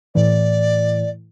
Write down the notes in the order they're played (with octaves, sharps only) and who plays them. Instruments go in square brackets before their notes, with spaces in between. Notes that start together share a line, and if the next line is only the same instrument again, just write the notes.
[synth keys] A2 E3 [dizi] D5